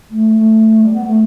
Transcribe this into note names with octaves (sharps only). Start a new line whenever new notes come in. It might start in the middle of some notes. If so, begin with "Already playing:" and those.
A3
A3
G3
B3
A3